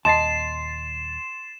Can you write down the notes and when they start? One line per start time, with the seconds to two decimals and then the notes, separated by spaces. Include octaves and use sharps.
0.05 D#1 D#2 D#5 A5 C6 A6 C7 E7